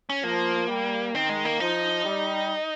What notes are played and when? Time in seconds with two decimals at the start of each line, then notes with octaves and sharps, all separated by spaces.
0.09 C#4
0.23 F3 A#3
0.69 G3
1.14 D#3 C4
1.29 G#3
1.45 A#3
1.60 F3 D#4
2.05 G3